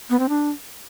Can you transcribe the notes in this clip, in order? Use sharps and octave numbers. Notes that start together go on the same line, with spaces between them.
B3
C4
D4